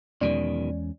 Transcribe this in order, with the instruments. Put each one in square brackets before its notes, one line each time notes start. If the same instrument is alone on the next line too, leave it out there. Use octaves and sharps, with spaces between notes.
[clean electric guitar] B1 B2 D#3 [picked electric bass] E2 G#3 C#4 [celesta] D5